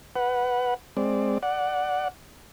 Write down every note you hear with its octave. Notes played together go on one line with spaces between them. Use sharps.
B4 F#5
G#3 C4 D5
D5 F#5